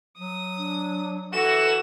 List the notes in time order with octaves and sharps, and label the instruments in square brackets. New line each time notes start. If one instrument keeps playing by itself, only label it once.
[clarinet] F#3 [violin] D#6
[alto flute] D4
[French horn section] E3 F#4 [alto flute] A4 [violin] E7